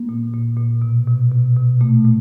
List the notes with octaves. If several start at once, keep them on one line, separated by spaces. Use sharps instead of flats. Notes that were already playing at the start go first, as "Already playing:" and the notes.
Already playing: A#3
A#2
A#2
A#2
B2
B2
B2
B2
A#2 A3
A#2